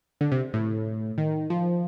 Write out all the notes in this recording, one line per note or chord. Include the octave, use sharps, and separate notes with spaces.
D3
C3
A2
D#3
F3